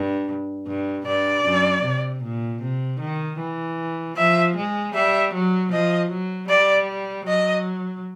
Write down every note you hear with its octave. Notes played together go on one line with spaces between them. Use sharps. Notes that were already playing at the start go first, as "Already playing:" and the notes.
Already playing: G2
G2
G2 D5
F#2
C3
A#2
C3
D#3
E3
F3 E5
G#3
G3 E5
F#3
F3 D#5
F#3
G3 D5
F#3 D#5